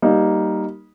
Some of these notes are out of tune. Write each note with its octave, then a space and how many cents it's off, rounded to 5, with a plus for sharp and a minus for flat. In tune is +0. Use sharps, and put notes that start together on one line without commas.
G3 -15 A#3 +0 D#4 +0